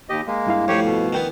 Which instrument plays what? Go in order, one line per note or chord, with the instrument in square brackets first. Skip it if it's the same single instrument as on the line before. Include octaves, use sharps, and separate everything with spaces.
[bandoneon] D#2 G4 D#5
G#3 A#3
[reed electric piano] G2 E4 F5
[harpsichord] F2 A2 [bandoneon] G4 C#5
[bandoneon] B2
[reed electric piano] D2 G5 [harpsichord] D#3 E3 B3